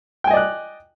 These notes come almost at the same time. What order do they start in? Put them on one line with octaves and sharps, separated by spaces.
G5 G#5 D#5 D5 F#6